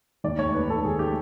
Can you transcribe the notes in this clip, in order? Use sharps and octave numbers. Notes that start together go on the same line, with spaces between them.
D#2 D5
A3 C#5
D#2 B4
D#2 A4
D#2 G#4
A3 G4